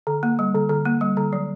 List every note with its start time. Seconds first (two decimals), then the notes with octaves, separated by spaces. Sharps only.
0.07 D3
0.23 A#3
0.39 G3
0.55 D3
0.69 D3
0.85 A#3
1.01 G3
1.17 D3
1.33 F#3